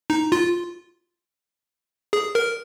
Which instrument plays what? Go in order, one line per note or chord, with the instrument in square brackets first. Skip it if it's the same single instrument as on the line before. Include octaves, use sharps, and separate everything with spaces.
[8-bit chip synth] D#4
F4
G#4
A#4